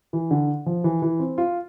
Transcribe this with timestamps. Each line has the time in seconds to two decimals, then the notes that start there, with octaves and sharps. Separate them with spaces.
0.13 E3
0.31 D3
0.66 F3
0.84 E3
1.02 E3
1.19 C4
1.38 F4